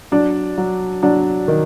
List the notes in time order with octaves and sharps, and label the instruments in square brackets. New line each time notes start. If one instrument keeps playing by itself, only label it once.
[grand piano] F#3 [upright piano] D4
[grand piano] F#3
[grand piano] F#3 [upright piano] D4
[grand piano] D#3